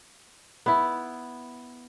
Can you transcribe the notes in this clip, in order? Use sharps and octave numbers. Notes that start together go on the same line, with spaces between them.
B3 E4